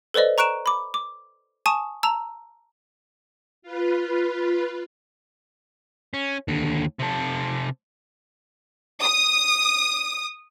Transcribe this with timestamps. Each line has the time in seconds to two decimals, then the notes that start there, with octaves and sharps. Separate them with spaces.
0.14 A4 B4 C5 D5 D#5
0.38 A#5 C#6 F#6 D7 E7
0.66 B5 D6
0.94 D6
1.66 G#5 A5 C#6 D#6 D#7 E7
2.03 A5 A#5 E6 F7
3.62 F4 B4
6.14 C#4
6.48 D#2 D3
6.99 C3 A4
9.01 D#6